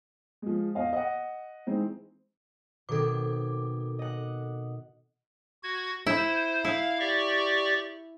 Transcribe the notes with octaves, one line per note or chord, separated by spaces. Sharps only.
F3 G#3
E2 D#5 F5
D#5 F#5
E3 G#3 C4 D#4
B2 D#3 C4 A4 D6
D#5 F#5
F#4 G#6
E4 C5
E4 F5
G4 D5 C#6